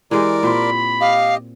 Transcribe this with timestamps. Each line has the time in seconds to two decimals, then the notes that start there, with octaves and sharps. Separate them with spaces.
0.11 E3 G#3 G4 A#4 D5
0.43 A#2 C4 B5
1.01 G4 D#5 F5